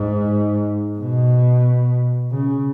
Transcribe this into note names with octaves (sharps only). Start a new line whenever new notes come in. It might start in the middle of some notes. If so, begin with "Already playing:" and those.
Already playing: G#2
B2
C#3